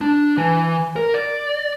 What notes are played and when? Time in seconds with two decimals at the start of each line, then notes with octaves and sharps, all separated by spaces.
0.01 D4
0.37 E3
0.96 A#4
1.14 D5